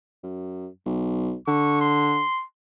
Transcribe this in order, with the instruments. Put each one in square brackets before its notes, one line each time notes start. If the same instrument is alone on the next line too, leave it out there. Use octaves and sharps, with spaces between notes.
[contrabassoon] F#2
B1
[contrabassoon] D3 [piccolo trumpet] C#6
[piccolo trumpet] C6